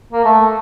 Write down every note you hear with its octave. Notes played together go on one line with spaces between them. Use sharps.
A#3
A3